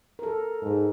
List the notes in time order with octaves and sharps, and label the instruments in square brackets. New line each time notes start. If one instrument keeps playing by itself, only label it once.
[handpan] A4 A#4
[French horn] G#2